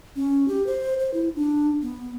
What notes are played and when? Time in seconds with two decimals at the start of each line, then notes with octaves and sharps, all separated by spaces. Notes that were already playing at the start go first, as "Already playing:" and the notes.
0.16 C#4
0.48 G4
0.67 C5
0.99 C5
1.14 E4
1.36 D4
1.82 B3